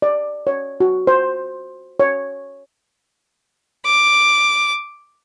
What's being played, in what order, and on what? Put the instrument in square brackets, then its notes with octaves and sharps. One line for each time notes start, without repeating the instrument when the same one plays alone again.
[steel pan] D5
C#5
F#4
C5
C#5
[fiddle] D6